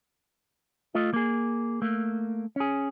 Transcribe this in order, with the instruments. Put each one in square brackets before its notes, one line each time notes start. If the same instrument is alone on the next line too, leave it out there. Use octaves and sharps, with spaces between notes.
[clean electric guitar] A3 F4 D#5
A#3 G#4
A3 A#3
C#4 G#4